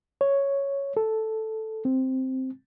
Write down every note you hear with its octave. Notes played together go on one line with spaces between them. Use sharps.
C#5
A4
C4